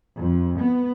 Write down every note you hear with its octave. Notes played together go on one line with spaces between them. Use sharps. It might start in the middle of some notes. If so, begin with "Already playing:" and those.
F2
B3